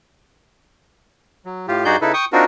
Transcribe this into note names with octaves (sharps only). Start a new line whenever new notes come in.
F#3
A2 F4 G4
G2 D#4 F#4 G#4 D5 G6
C#3 D#4 E4 A4 B4
G5 C#6 D#6
C4 D4 D#4 F4 F#4 A#4